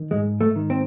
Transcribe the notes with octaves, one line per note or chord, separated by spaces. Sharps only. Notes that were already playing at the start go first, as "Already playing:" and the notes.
Already playing: D#3
G#2 G#3
A3
D#3
C4